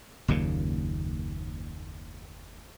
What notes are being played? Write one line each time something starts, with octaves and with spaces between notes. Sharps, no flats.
F#1 D#2 A#2 C#3